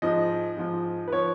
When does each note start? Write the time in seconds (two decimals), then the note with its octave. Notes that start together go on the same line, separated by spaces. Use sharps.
0.02 G#2 F3 D#5
0.57 G#2 F3
1.08 B4
1.12 F3 C#5